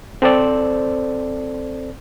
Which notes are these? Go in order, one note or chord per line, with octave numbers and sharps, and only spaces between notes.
C4 A4 C5 D5